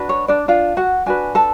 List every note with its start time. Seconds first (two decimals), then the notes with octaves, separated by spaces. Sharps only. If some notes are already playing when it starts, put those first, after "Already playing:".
Already playing: D4 F#4 B4
0.09 C#5
0.28 D4 D5
0.48 D4 F4 F5
0.77 F#4 F#5
1.06 D4 F#4 B4 G#5
1.35 A4 A5